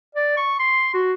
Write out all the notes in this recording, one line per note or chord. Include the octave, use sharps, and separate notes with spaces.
D5
C#6
C6
F#4